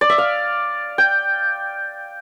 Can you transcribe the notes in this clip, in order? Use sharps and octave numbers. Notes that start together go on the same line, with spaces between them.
D5
E5
F5
G5